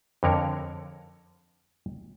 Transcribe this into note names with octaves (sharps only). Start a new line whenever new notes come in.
F2 D3 A#4 C#5